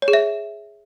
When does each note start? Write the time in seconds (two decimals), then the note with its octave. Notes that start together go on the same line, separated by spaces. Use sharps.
0.02 C#5
0.08 G#4
0.13 E5